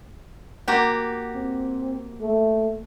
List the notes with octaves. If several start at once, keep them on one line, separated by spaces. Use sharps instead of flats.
A#3 F#4 G4
C4
A3